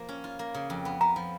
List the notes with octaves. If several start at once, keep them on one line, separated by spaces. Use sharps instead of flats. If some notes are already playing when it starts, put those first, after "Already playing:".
Already playing: F3 A#3
C#4
F4
A#3
C#3
F2
B3
B3 A#5
F3